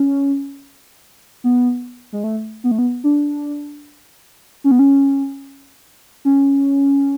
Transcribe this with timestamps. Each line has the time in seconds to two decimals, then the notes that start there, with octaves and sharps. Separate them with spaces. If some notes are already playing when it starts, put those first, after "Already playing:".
Already playing: C#4
1.44 B3
2.13 G#3
2.24 A3
2.64 B3
2.71 A3
2.78 B3
3.04 D4
4.64 C#4
4.71 B3
4.79 C#4
6.25 C#4